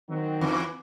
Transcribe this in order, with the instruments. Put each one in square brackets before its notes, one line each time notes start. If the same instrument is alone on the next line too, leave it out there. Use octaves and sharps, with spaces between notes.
[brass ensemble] D#3 F#3 C4
[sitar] E2 E3